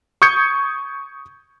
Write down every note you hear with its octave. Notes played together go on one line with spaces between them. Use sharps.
C#6 D#6 G6 G#6 C#7